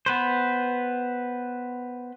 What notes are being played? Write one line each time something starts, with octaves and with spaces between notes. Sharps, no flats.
B3 B4 C5